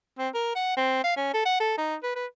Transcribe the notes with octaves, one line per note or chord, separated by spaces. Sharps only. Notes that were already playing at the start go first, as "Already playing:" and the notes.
C4
A#4
F#5
C4
F5
C#4
A4
F#5
A4
D#4
B4
B4